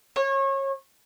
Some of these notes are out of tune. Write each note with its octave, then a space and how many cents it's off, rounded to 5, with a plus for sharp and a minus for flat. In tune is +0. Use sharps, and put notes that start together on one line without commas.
C#5 -30